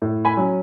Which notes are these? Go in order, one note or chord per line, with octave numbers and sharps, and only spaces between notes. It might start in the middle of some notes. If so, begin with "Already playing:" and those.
A2
G#5 B5
F#3 C#4